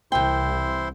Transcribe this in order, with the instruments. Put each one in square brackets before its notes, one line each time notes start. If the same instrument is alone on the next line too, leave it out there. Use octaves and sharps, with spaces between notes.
[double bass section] C2 [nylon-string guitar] E3 G5 [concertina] E4 C5 C6